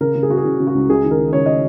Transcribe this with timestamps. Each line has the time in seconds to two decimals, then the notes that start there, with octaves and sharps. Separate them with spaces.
0.01 C#3 A#4
0.15 C#3
0.23 G#4
0.29 C#3 F#4
0.37 G#4
0.45 C#3
0.60 C#3
0.67 F#4
0.75 C#2
0.90 C#2 G#4
1.04 D#3
1.11 A#4
1.19 D#3
1.33 C#2 C#5
1.46 D#5